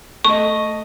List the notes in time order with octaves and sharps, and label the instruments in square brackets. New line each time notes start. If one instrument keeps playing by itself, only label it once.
[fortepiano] A3 D#5 [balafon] C#6